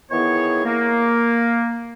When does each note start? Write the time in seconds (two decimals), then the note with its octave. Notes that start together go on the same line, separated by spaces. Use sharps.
0.11 D#3 E3 B3 E4 G#4 C#5
0.65 A#3